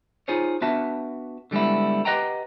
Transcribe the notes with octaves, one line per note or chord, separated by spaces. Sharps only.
D#4 F4 G#4 C5 C#5
B3 D4 F#4 B4 E5 A5
D3 G3 G#3 B3 E4
G4 B4 D#5 F#5 G5 A#5